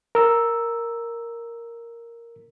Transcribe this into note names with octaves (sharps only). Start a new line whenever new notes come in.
A#4 E6